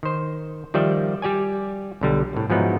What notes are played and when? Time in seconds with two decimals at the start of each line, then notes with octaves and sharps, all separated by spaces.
0.03 D#3 C5
0.74 D#3 F3 G3 D5 E5 G5
1.22 G3 G4 D5 G#5
2.01 B1 D3 G3
2.33 C2 A2
2.50 G#2 F3 F#3 B3 D#4 E4